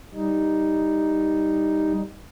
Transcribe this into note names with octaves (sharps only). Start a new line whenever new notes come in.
G3 D#4